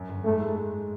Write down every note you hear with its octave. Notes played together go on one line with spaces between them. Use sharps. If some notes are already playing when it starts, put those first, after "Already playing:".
Already playing: F#2
G1
G#2 A3
G#3